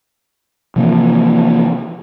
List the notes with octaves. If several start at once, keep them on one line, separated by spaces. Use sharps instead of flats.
C3 E3 F3 A#3